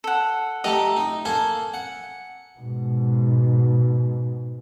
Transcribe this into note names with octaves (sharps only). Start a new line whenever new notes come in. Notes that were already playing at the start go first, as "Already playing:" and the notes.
A4 F#5
A3 G4 A4 D#5 A#5
D#4
A#3 A4 C5 G#5
F#5
G#2 B2